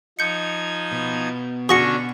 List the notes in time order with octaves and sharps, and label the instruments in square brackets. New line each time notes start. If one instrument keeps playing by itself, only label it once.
[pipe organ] F3 D#4 G#6 [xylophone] G6 C#7
[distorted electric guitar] B2
[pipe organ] D3 C#4 D4 [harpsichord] F#4 G#4 [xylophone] C#6 A#6 C#7